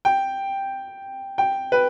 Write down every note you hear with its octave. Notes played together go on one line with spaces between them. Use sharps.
G5
G5
B4